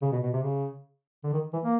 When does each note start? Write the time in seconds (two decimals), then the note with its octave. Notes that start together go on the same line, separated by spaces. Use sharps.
0.02 C#3
0.12 B2
0.23 B2
0.33 C3
0.43 C#3
1.24 D3
1.33 D#3
1.53 E3
1.64 A#3